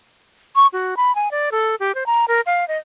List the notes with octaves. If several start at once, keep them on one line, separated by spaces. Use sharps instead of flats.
C#6
F#4
B5
G#5
D5
A4
G4
C5
A#5
A#4
F5
D#5